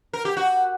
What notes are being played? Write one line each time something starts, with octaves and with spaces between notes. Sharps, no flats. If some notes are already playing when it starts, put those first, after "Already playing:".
A#4
G4
F#4